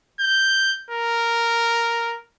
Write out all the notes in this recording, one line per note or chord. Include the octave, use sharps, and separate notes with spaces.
G6
A#4